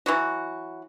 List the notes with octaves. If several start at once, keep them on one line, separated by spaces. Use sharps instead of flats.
E3 F#3 F#4